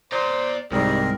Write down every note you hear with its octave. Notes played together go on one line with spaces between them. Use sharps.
C5 D5 A#5
C2 G#2 D#3 G3 C4 G#4 A#4